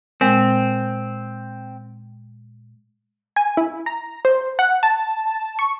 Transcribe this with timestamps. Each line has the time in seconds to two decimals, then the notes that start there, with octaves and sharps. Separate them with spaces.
0.21 A#2 G#3 C4
3.36 G#5
3.57 E4
3.86 A#5
4.25 C5
4.59 F#5
4.83 A5
5.59 C#6